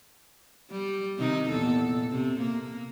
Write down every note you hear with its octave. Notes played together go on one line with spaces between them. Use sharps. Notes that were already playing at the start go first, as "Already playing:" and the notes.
G3
C3 D#3 D#4
E2 A#2 A4
C3
A#3